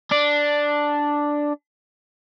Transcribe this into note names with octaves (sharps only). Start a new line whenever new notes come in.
D4